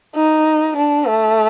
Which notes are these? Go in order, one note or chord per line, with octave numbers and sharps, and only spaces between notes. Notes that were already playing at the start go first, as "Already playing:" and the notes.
D#4
D4
A3